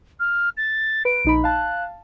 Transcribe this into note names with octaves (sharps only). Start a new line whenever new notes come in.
F6
A6
B4 D7
A#1 D#4 B5
F5 A5 F#6